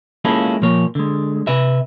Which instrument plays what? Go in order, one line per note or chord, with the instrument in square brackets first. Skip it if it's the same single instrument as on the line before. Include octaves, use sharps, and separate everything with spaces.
[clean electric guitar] G#3 A#3 C#4 E4 F4 A4
A#2 F3 A#3 C#5
D3 G#3
C3 B4 E5